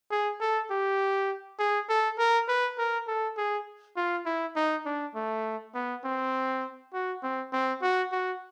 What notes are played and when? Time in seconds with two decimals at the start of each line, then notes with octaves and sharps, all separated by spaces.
0.11 G#4
0.41 A4
0.70 G4
1.59 G#4
1.89 A4
2.19 A#4
2.48 B4
2.78 A#4
3.07 A4
3.37 G#4
3.97 F4
4.26 E4
4.56 D#4
4.86 D4
5.15 A3
5.74 B3
6.05 C4
6.93 F#4
7.23 C4
7.53 C4
7.82 F#4
8.12 F#4